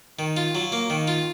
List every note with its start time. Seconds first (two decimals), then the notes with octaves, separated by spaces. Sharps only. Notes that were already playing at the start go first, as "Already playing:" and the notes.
0.19 D#3
0.37 F4
0.55 F#3
0.72 A#3
0.90 D#3
1.08 F4